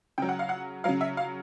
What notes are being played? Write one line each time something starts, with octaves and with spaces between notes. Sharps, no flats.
C#3 F#3 G5
F#5
F5
F#5
C#3 F#3 F5
E5
F5